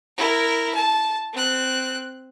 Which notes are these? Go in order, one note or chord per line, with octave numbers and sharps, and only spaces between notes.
E4 A#4
A5
C4 F#6